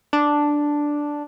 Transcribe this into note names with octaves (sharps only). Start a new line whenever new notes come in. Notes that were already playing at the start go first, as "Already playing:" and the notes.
D4